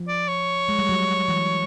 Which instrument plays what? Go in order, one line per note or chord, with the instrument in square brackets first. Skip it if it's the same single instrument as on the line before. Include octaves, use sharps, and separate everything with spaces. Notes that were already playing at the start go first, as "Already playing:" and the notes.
Already playing: [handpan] F3
[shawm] D5
C#5
[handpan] G#3
G3
F#3
E3